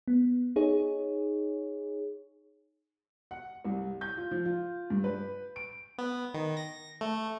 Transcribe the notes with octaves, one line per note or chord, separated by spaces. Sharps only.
B3
D#4 G#4 C#5
F#5
C2
G6
F4
F3
F4
G2
B4
D7
B3
D#3
A#6
A3